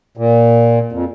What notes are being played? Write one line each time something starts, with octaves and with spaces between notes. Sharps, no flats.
A#2
F2